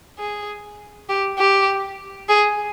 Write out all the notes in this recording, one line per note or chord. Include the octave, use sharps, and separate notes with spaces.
G#4
G4
G4
G#4